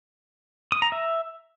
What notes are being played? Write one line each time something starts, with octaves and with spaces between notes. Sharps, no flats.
D#6
A#5
E5